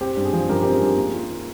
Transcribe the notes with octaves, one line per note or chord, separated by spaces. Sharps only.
C4 G4
G2
G#4
F3
G2 G4 A#4
C4 G4 A#4
G#4
G2 G4
A#3 G#4
F4
D#3